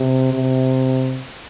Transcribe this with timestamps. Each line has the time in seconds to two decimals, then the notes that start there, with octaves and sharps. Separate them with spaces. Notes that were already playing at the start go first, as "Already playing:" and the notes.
Already playing: C3
0.33 C3